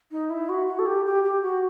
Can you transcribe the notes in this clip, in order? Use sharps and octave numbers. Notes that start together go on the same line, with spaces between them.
D#4
E4
F#4
F#4
A4
G4
G4
G4
F#4